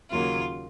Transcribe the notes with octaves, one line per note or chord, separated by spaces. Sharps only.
D#2 C#3 F#3 A#3 F4